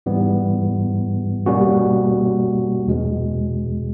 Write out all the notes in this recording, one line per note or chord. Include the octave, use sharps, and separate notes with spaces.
G#2 E3 G3 B3
B2 G3 A#3 C#4 F#4
E2 B2 G#3